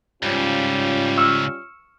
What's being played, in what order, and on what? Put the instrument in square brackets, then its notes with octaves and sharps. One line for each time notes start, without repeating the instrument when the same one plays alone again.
[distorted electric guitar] C#2 G#2 [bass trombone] G3 [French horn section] C#4 F4
[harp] C#6 E6 F6